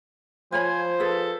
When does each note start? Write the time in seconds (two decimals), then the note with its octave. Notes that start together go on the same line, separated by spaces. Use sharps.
0.52 F3 F4 C5 C#5 G#5 B5
1.00 G#4 A4 B4